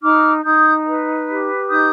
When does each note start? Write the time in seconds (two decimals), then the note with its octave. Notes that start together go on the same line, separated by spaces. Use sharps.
0.02 D#4 D6 F6
0.43 D#4 D#6 G6
0.86 B4
1.28 G4
1.70 D#4 D#6 G6